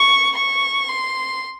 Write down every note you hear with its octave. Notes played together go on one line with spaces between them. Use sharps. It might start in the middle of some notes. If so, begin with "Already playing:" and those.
Already playing: C#6
C#6
C6